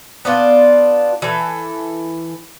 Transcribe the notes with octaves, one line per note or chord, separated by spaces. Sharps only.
B3 D4 F4
E3 A4